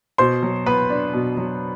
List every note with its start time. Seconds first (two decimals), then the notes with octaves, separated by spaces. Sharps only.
0.18 B2 C5 C6
0.43 F#3
0.66 B3 B4 B5
0.90 D4
1.13 B2
1.37 F#3